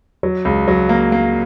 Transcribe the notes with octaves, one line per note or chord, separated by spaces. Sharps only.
F#3
C#2
F#3
A#3
A#3